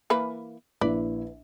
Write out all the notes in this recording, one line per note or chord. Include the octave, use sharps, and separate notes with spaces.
E3 A#3 B4
A#1 E4 B4 D5